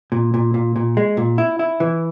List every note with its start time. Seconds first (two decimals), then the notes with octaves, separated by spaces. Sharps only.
0.12 A#2
0.34 A#2
0.54 A#2
0.76 A#2
0.97 G#3
1.17 A#2
1.38 E4
1.59 E4
1.80 E3